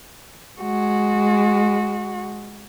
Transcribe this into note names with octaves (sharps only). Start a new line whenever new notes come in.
G#3 F#4